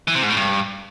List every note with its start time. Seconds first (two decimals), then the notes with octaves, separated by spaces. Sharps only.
0.08 E3
0.15 C3
0.22 G#2
0.29 A2
0.37 G2